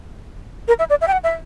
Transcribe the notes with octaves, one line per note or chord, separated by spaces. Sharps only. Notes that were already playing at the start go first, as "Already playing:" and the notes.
A#4
E5
D5
E5
G5
F#5
E5